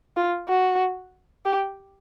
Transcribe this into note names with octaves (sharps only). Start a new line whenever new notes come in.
F4
F#4
G4